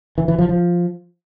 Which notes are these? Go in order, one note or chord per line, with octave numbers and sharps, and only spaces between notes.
E3
E3
F3
F3